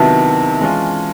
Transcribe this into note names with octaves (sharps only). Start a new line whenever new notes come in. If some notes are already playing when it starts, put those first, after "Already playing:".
Already playing: C3 D#3 F#3 B3 E4 A5
E3 G#3 C#4 F4